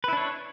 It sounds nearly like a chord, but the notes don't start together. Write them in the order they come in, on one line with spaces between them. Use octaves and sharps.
B4 E4 D4 C#5